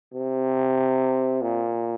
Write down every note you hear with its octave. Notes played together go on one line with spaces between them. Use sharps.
C3
A#2